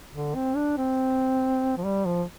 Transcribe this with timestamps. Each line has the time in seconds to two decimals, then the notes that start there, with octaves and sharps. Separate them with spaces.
0.13 D3
0.35 C4
0.56 D4
0.77 C4
1.77 F3
1.85 G3
2.06 F3